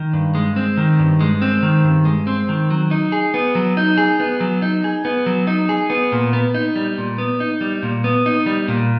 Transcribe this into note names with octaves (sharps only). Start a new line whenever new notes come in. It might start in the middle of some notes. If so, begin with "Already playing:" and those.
Already playing: D#3
G2
G#3
C4
D#3
G2
G#3
C4
D#3
G2
G#3
C4
D#3
F#3
D#4
G#4
B3
F#3
D#4
G#4
B3
F#3
D#4
G#4
B3
F#3
D#4
G#4
B3
A#2
B3
D#4
G3
A#2
B3
D#4
G3
A#2
B3
D#4
G3
A#2